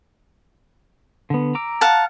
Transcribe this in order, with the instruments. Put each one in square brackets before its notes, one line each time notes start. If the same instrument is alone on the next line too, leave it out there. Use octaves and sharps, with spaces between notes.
[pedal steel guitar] D3 B3
A#5 D6 E6
[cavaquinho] F5 F#5 A5